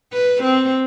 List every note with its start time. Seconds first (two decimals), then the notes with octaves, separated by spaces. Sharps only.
0.12 B4
0.43 C4